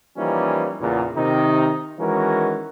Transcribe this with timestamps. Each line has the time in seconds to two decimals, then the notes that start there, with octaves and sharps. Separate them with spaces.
0.17 E3 F3 G3 A#3 C#4 D#4
0.81 E2 A#2 C#3
1.17 C3 D#3 D#4
2.00 D#3 E3 G#3 C#4 F#4 A#4